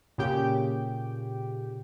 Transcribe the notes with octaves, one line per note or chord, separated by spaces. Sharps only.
A#2 C#3 G4 G5